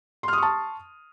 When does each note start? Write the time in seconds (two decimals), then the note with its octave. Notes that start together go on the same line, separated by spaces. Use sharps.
0.23 C6
0.28 F6
0.33 D#6
0.38 C#6
0.42 A5